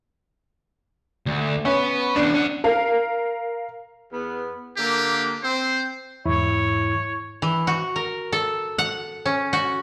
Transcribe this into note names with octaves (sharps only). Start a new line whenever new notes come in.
D2
B3 C#4
E2 C#3 D4
C#4 F#5
A#4 F5
E2 B3
D3 A#3 G4
C4 C5
E2 G#2 E4 C#5
E3
F#4
A#4
A4
F#5
C#4
F#4